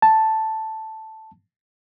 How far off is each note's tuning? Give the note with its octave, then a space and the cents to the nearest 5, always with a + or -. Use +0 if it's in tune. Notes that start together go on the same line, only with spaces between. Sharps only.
A5 +0